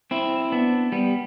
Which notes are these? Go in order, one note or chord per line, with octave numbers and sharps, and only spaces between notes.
C4 E4
B3 D4
G3 B3